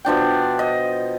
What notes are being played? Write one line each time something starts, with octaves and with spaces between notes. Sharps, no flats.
B2 F3 D4 G5
D#5